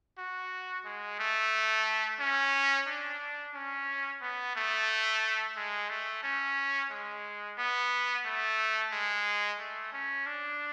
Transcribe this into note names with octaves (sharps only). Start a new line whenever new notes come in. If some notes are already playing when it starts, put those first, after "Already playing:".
F#4
G#3
A3
C#4
D4
C#4
B3
A3
G#3
A3
C#4
G#3
B3
A3
G#3
A3
C#4
D4